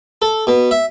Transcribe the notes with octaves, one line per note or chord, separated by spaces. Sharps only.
A4
B2
E5